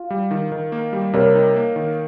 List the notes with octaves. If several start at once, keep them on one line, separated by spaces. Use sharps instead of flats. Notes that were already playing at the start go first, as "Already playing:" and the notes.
Already playing: F4
G3
D#3
D#3
A#3
G3
C3 A#4 C#5
D#4
A#3
D#3